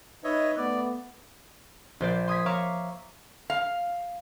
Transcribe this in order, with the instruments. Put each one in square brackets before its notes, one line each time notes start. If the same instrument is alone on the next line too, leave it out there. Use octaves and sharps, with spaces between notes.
[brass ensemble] D#4 B4 [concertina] C#5 D#5 E5
[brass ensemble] A3 B3 [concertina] D5
[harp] A#1 C5 D5
C6 D#6 G#6 B6
C#5 E5 F5 A#5 C#6 D6
[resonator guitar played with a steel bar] F5